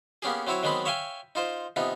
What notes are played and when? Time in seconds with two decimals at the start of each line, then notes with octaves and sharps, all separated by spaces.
0.22 A#3 B3 C#4 G4 G#4
0.47 F#3 C4 E4 F#4 C#5
0.63 D#3 F#3 G#3 B3 C4 B5
0.85 C#5 E5 F5 G5 G#5
1.35 D#4 F4 C5
1.76 C3 F3 B3 D#4